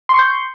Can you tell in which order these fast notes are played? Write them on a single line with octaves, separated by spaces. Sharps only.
C6 C#6 G6